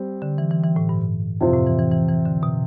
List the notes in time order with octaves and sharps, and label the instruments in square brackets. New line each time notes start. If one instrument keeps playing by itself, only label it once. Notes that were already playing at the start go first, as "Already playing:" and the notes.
Already playing: [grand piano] G3 C4
[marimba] D3
E3
E3
E3
A2
G2
[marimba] F2 [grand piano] C3 F3 C4 F4
[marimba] A2
E3
E3
E3
E3
D3
B2